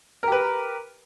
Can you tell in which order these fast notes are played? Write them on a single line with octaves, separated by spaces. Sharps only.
A#4 G4 B4